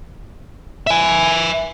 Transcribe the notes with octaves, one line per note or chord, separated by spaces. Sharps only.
E5 G#5